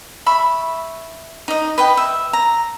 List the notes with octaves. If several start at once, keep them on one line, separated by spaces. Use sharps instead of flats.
E5 B5 C#6
D#4 D#5
B4 D#5 G5
E5
A#5